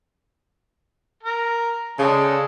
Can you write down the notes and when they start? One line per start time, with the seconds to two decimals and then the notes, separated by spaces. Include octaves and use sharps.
1.23 A#4
1.99 C#3 G#3 A4 D5